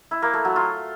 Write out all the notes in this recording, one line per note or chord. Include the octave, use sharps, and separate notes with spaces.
E4
A#3
A3
F#3
F4